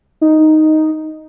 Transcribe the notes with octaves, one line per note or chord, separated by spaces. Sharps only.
D#4